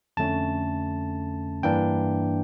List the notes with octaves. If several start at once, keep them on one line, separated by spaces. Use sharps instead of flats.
F2 D3 A3 C#4 A5
G2 E3 A#3 D4 G5